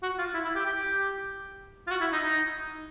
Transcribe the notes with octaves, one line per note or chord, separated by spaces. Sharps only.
F#4
F4
E4
E4
G4
G4
F4
F#4
E4
D#4
D#4